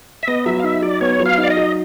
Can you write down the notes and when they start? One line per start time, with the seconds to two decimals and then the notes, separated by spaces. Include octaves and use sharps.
0.23 E5
0.27 B3 D#5
0.46 F#3 E5
0.60 F5
0.63 D#4 E5
0.82 F#3 D5
1.01 B3 C#5
1.19 F#3
1.26 F5
1.38 D#4
1.43 D5
1.50 D#5
1.57 F#3